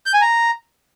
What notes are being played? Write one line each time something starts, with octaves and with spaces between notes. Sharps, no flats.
G6
G#5
A#5